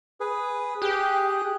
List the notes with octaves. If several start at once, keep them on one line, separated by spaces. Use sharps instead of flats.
G#4 B4
G4 G#4 F#6